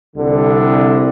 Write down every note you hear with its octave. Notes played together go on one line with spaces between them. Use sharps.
C2 D3